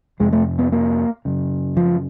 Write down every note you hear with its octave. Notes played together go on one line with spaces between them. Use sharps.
F2 C3 G#3
A3
B3
A#3
F#2 C#3
F3